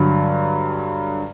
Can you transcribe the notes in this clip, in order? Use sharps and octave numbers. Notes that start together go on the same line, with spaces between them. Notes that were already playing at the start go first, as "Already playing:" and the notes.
Already playing: G2 D3 F#3